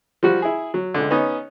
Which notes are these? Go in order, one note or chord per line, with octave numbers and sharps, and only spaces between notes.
F3 G3 F#4
E4 G#4
F#3
C#2 D3
B3 C#4 D#4